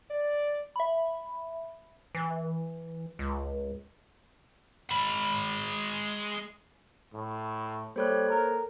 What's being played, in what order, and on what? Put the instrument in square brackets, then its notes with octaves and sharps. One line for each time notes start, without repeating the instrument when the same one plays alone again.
[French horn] D5
[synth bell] E5 B5
[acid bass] E3
C#2
[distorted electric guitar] G#3 B5
[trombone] A2
[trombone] G3 [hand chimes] A#3 A4 [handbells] C5 C#5 F#6
[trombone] A#4